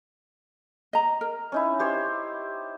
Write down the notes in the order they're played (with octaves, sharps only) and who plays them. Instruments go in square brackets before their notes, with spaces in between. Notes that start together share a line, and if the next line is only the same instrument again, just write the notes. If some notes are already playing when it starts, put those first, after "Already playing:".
[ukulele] D#5 A#5
A#4
[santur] C#4 D#4 E4
G4 C5 C#5